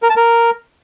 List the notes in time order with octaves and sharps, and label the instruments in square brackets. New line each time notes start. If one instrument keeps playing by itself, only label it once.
[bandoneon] A#4
A5
A#4